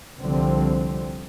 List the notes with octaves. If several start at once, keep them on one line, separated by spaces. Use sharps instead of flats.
C2 D3 F3 G3 C4